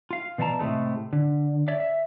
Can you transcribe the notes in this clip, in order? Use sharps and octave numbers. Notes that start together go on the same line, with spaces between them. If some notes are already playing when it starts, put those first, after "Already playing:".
F4 F5
B2 E3 D5 F5 A5 A#5
A2 C3 E3 G#3 A3
D3
C#5 D5 E5
E5